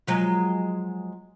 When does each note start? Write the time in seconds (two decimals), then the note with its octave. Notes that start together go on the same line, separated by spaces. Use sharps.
0.07 F3 F#3 G#3